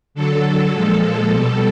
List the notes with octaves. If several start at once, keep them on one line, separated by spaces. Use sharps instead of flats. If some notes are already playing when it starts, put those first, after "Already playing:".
D3 F#3 A4
A#2 F3 G#3
B2 G3 A4